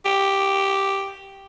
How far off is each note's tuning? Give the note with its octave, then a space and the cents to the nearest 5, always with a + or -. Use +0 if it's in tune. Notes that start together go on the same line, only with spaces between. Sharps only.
G4 +0